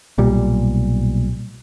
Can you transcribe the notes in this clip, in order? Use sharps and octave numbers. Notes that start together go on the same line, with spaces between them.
B1 A#2 G3